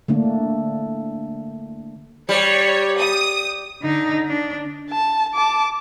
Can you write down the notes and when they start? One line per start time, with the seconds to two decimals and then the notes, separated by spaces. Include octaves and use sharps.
0.08 D3 A3 A#3 D4
2.29 G3 C#5
2.98 D#6
3.82 D3 D#4
4.27 D4
4.91 A5
5.34 A5 D6